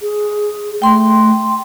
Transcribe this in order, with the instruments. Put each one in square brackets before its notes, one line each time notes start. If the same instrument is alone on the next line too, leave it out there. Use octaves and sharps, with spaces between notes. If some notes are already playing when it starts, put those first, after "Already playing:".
[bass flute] G#4
[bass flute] A3 [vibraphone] G5 C6